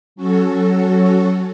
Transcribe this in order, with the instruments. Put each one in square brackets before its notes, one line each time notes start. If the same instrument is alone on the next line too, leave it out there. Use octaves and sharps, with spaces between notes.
[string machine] F#3 C#4 F#4 A4